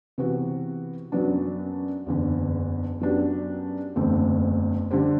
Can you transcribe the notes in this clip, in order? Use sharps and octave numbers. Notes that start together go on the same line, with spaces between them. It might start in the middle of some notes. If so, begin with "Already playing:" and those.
C3 E3 B3 F#4
F#2 F#3 B3 D4
F#1 E2 D3
F#2 F#3 B3 D4 G4
F#1 E2 D3 A3 C4
D3 G3 D4 G4 C5